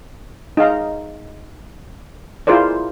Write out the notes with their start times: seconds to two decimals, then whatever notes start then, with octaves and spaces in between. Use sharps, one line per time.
0.57 D#4 G#4 F5 A#5
2.47 E4 F4 G#4 A#4 C5 D5